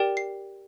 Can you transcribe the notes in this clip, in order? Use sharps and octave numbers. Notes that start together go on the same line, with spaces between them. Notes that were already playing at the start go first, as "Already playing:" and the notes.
Already playing: G4 A#4 D5 G5
C7